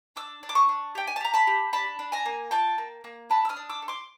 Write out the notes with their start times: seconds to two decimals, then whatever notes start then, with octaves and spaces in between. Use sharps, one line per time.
0.16 D4 D6 E6
0.43 D4
0.49 D6
0.55 C#6 D#6
0.69 D4
0.95 G4 G5
1.07 G#5
1.16 A5
1.21 G4 A#5
1.34 A5 B5
1.47 G4
1.73 D4 A5 B5
1.99 D4
2.12 G#5 A#5
2.26 A#3
2.51 F4 G5 A5
2.78 A#3
3.04 A#3
3.30 D4 A5 B5
3.45 E6
3.49 D#6 F6
3.57 D4
3.69 D6 E6
3.82 A4
3.88 C6 D6